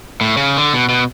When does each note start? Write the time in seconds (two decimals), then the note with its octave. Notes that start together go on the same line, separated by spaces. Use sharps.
0.21 A2
0.37 C#3
0.57 D3
0.74 B2
0.89 B2